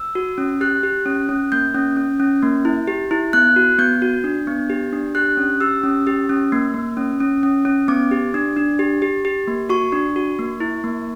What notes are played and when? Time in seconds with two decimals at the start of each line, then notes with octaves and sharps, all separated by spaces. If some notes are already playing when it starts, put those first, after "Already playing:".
Already playing: E6
0.15 F#4
0.38 C#4
0.61 G4 F#6
0.83 G4
1.06 C#4
1.29 C#4
1.52 A#3 G6
1.75 C#4
1.96 C#4
2.20 C#4
2.42 A#3
2.65 E4
2.88 G4
3.11 E4
3.33 B3 F#6
3.56 F#4
3.78 B3 G6
4.02 F#4
4.24 D4
4.47 B3
4.70 G4
4.93 D4
5.15 G4 F#6
5.37 C#4
5.61 G4 E6
5.83 C#4
6.07 G4
6.29 C#4
6.52 A#3
6.74 A#3
6.97 C#4
7.20 C#4
7.43 C#4
7.65 C#4
7.88 B3 D6
8.11 G4
8.34 D4
8.57 D4
8.79 G4
9.02 G4
9.25 G4
9.48 A#3
9.69 F#4 C#6
9.92 D4
10.16 F#4
10.39 A#3
10.60 E4
10.84 A#3